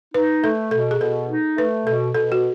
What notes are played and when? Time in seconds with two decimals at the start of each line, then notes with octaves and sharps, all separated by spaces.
0.14 D#4 B4
0.43 A3 A4
0.71 B2 A4
0.91 G#4
1.01 B2 A4
1.30 D#4
1.57 A3 B4
1.86 B2 A4
2.15 B2 A4
2.32 F#4